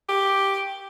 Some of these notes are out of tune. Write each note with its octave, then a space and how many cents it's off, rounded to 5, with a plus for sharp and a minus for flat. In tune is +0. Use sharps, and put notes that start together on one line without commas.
G4 +0